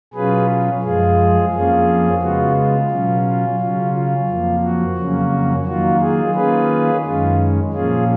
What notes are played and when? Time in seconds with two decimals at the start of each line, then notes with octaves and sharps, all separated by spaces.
0.14 B2 F#3 C#4 F4 G#4 B4
0.83 F#2 F3 G#3 F4 G#4
1.52 F2 F3 A#3 C#4 F4 G#4
2.21 C#3 G#3 B3 F4 F#4
2.56 F4
2.89 B2 F#3 C#4
3.24 F4
3.60 C#3 F#3 C#4 F4
3.93 F4
4.27 F2 F3 A#3
4.63 F#4
4.97 F2 C#3 F#3 A#3 C#4
5.65 D#3 F#3 A#3 F4 F#4
6.01 F4 G#4
6.35 D#3 A#3 C#4 F4 G#4 B4
7.03 F#2 D#3 G#3 C#4 F4
7.73 A#2 F3 A#3 C#4 F4 G#4